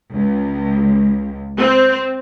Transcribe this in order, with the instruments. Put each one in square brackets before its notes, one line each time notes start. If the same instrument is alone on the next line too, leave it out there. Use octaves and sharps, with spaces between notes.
[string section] C#2
C4